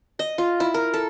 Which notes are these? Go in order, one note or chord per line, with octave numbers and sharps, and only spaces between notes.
D#5
F4
E4
A#4
A4